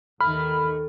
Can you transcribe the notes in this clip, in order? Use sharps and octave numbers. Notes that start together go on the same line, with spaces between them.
D#2 D#3 A3 B5 F6